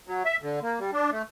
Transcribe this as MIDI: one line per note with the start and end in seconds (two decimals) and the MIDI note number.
0.08 0.23 54
0.25 0.37 76
0.42 0.60 50
0.62 0.79 58
0.79 0.91 55
0.93 1.10 62
1.12 1.22 57